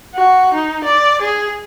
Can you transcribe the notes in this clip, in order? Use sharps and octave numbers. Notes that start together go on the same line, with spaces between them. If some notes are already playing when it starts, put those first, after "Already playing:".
F#4
D#4
D5
G#4